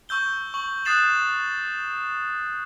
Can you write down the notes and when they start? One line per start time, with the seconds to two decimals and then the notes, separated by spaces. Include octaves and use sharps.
0.09 C#6 E6 G6 G7
0.54 C#6 F#7
0.85 D#6 F#6 A6 C7 E7 F#7